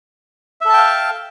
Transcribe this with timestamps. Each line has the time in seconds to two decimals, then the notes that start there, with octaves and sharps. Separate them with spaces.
0.61 E5
0.65 A4
0.69 A5
0.73 G5
0.77 F5